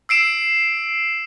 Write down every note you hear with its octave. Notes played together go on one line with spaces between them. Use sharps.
E6 C7 D7 E7